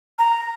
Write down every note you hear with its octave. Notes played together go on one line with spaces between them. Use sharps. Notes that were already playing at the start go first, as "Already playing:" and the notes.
A#5